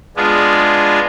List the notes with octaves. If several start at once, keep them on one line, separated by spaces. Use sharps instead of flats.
G#3 B3 D4 F4 G#4